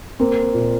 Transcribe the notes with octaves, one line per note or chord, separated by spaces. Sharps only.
A#3 C4
A#2